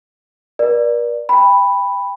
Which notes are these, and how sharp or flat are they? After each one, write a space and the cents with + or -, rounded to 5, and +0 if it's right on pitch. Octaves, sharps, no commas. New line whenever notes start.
A#4 +45 D5 +10
G5 +30 B5 +0